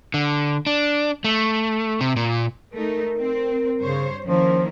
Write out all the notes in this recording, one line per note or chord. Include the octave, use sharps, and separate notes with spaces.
D3
D4
A3
C3
A#2
A3 D#4 A#4
C4
G2 C#3 C5 C#5
D#3 F3 A#3 C#4 E4